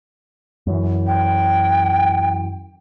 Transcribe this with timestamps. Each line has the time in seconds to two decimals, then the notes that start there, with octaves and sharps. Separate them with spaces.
0.67 F#2 E3
1.07 G5